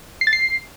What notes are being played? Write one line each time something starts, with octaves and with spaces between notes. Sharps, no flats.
C7
A6
C7